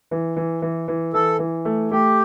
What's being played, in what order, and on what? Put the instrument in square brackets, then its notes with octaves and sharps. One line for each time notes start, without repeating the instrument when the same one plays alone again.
[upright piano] E3
E3
E3
E3
[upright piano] E3 [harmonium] A4
[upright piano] E3
A3
[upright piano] A3 [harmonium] G4